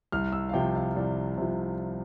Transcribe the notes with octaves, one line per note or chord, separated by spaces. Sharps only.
C2 F6
E6
F5
C3 F3 G5
F5
C2 D5
C3 F3